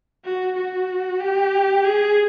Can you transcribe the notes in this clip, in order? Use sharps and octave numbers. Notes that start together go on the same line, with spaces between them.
F#4
F#4
G4
G#4